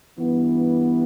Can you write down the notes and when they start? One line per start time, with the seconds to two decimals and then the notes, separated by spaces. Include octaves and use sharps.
0.19 G2 E3 B3